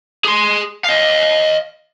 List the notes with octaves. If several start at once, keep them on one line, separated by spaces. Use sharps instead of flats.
G#4 C6
D#5 F5